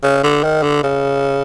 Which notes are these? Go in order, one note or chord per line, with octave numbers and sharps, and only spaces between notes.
C#3
D3
D#3
D3
C#3